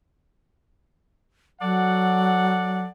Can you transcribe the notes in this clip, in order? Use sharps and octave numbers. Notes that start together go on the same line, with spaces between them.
F#3 A4 D5 F#5